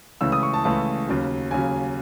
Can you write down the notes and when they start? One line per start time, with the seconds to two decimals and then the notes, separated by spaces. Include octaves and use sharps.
0.21 C#2 C#3 E3 A3 E6
0.32 D#6
0.43 C#6
0.54 A5
0.64 C#2 C#3 E3 A3 A5
1.08 D#2 C#3 F#3
1.51 D#2 C#3 F#3 G#5